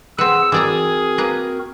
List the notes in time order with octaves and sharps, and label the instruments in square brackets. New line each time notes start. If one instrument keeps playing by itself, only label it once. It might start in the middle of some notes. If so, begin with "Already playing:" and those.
[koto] C4 B4 [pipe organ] G#4 F#5 [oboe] E6
[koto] E3 D5 A#5 [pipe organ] C4 F#4 A#4 [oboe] G#4
[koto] A#3 B4 A#5